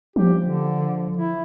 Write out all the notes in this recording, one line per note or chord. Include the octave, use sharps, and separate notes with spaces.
F3 G4
D3
E4